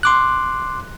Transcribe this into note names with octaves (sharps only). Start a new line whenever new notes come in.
C6 D6 F#6